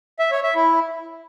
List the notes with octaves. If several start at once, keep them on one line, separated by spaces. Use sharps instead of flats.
E5
C#5
E5
E4